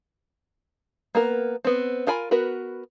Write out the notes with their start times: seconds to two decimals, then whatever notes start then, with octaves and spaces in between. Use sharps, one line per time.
1.15 A#3 B3 A#4
1.65 B3 C4
2.07 F4 A#4 G#5 B5
2.31 B3 F#4 A#4 B4